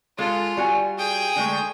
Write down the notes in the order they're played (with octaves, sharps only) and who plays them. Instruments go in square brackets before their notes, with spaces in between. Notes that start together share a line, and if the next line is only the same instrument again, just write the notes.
[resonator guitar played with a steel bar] G#3 A4 [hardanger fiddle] F4
[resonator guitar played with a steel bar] G3 F#4 G#5
[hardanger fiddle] G#4 G5
[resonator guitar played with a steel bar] D3 G#3 A3